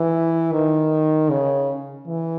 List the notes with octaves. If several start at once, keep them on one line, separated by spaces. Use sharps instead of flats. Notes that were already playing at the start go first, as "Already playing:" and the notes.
Already playing: E3
D#3
C#3
E3